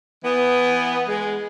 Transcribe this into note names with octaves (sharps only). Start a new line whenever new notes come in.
E3 B3
G#3